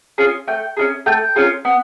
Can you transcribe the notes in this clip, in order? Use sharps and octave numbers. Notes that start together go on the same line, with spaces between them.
C#4 F4 G#4
A3 G5
C#4 F4 G#4
A3 G5
C#4 F4 G#4
B3